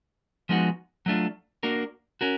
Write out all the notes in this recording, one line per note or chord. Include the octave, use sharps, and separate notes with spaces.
F3 G#3 B3 D#4 F#4
F#3 A3 D4 F4
A#3 D4 F#4 A#4
C#4 F#4 A#4